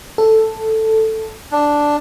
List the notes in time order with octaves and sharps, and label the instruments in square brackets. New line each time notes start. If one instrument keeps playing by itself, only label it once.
[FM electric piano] A4
[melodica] D4